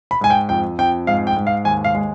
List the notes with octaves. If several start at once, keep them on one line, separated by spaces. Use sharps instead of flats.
B5
G#2 G#5
G5
F2 G5
F2 G5
G#2 F5
G5
G#2
F5
D#2 G#5
F5
G#3